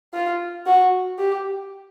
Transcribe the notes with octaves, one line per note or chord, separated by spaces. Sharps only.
F4
F#4
G4